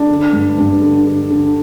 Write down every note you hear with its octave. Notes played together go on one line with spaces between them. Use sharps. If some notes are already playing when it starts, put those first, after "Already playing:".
Already playing: D4
D3
G2
G2
D3
D3
D3